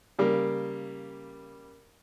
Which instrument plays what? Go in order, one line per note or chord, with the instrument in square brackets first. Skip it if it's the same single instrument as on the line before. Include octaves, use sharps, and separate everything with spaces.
[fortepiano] C#3 G3 A#3